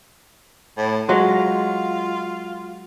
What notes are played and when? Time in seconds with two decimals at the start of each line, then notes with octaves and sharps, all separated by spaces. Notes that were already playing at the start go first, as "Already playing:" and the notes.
0.78 A2
1.09 F#3 G#3 F4